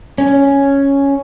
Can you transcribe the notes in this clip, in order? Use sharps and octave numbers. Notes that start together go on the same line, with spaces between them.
C#4